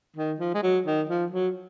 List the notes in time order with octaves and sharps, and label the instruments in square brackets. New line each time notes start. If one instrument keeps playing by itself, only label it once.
[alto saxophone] D#3
F3
G#3
F#3
D#3
F3
F#3